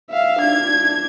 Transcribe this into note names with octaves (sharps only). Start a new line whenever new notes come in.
E5 F5
D4 G#6